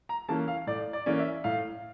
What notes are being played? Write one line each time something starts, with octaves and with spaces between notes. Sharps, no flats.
A#5
E3 A#3 C#4 A5
F5
A2 D5
D5
E3 A#3 C#4 D5
E5
A2 F5